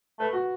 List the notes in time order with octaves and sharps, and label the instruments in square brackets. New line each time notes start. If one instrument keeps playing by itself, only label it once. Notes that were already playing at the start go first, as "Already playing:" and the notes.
[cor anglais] A3 [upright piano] B4
[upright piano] F#4